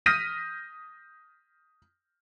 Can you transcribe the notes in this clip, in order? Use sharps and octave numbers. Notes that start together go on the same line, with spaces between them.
D#6 F6 G6 A#6 B6 D#7